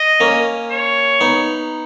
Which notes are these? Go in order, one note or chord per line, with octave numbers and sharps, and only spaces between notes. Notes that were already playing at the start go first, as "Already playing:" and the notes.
Already playing: D#5
A#3 C#4
C#5
B3 D#4